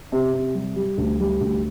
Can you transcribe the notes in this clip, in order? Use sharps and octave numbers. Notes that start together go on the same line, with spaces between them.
C3
C3
G3
G3
D2
G3
D2